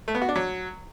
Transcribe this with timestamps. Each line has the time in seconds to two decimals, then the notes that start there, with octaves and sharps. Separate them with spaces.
0.08 A3
0.15 B3
0.22 F#4
0.29 D4
0.36 F#3